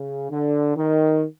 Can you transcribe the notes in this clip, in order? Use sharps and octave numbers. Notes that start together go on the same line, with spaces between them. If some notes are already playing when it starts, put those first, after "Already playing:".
Already playing: C#3
D3
D#3